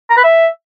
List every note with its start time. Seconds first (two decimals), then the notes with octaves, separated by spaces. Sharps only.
0.10 A#5
0.17 B4
0.24 E5